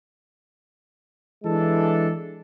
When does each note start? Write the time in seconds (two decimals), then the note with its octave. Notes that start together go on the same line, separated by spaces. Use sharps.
1.45 E3 G#3 D4 A4